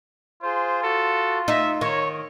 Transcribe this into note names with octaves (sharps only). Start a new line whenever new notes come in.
F4 G#4 C5
F#4 A4
D#4 E5
D#3 C#5